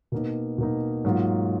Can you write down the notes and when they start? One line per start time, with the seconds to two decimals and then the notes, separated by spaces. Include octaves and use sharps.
0.12 B2 A#3 D#4
0.58 B2 A#3 D#4
1.05 G#2 F#3 A#3 F4